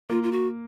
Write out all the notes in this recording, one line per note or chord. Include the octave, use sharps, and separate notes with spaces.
A#3 F4
F4
F#4